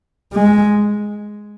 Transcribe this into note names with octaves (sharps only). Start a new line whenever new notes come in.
G#3